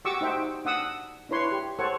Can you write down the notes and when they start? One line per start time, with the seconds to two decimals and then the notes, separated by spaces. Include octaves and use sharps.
0.05 F#4 G4 C#6 D6 E6
0.21 D#4 C5 E5 G5
0.65 D4 F#5 D#6 E6
1.29 D4 E4 B4 C#5 C6
1.52 G4
1.79 A4 C5 C#5 F#5 C#6